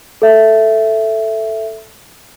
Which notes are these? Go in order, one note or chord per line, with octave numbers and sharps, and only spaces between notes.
A4 E5